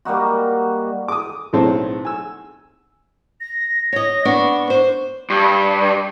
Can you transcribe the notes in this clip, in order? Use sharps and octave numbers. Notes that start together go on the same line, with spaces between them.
G3 A#3 D#4 F#4
D6 D#6
B1 A2 A3 C4 C#5 A5
G#5 E6
A#6
C#5 D#5 A#6
B3 D4 C#6
C5
G2